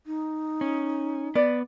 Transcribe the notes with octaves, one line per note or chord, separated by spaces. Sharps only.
D#4
C#4
B3 D5